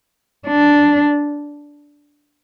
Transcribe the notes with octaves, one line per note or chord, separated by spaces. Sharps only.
D4